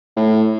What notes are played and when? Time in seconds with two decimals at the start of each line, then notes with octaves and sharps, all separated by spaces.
0.17 A2